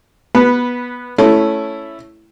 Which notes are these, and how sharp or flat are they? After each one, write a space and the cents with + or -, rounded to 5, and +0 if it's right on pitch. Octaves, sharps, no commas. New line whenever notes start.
B3 -15 B4 +0
A3 -5 C#4 +0 E4 +5